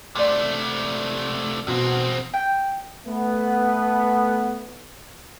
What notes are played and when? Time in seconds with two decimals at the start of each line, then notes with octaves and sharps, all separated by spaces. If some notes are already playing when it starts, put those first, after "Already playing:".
0.15 C3 A3 D5 C6
1.67 E2 B2 C4 F#4
2.34 G5
3.06 A3 B3